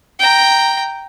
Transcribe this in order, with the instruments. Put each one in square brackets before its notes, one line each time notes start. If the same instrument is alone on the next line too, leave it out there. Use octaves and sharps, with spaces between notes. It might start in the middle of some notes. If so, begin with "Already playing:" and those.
[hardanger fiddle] G5 A#5